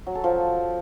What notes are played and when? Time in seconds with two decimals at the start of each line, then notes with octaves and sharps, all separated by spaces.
0.07 F#3
0.15 A4
0.24 F3